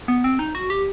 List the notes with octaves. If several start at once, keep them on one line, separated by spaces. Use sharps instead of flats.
B3
C4
D#4
F#4
G4